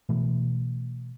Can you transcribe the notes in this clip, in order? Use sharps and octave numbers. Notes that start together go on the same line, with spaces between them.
B2 E3 A3